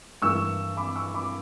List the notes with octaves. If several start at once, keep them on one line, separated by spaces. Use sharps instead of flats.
G2 E3 A#3 C#6 E6
B5 D6
C#6 E6
B5 D6